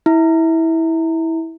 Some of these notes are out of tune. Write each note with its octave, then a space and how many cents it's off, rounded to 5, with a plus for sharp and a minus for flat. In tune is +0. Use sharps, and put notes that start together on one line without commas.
E4 -20